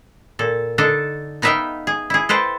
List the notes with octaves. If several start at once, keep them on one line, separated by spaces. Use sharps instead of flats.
A#2 A4
D3 D4 D#4 A4
B3 D#4 B4 E5 F5 G5
G#4
E4 G#4
A4 B4 C5 G5